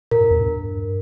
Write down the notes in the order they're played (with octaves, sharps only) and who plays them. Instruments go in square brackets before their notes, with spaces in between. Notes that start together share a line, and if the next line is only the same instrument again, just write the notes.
[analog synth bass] A#2 [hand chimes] A#4
[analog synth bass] G2
E2
G2